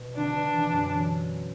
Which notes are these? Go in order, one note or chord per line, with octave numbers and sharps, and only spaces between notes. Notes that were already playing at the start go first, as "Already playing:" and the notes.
Already playing: B2
D3 D4
B2
E3
F#2